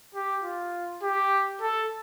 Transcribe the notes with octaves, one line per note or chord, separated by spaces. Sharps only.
G4
F4
G4
A4